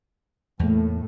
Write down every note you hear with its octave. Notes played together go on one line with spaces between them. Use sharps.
E2 A2 A#3